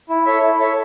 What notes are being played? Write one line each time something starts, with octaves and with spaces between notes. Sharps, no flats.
E4
A4 C#5 E5
E4
A4 C#5 E5